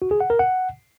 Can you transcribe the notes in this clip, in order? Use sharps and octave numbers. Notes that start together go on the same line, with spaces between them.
F#4
G#4
F#5
A#4
F#5